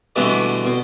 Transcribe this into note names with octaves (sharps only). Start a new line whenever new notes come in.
B2 D3 E3 G3 A3 B3
B2